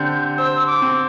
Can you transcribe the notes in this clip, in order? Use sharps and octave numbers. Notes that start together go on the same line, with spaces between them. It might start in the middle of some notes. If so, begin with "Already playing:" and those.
Already playing: D3 C4 G4 G6
C5 E6
D6
C4